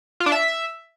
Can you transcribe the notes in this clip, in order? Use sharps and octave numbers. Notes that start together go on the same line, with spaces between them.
F4
D4
E5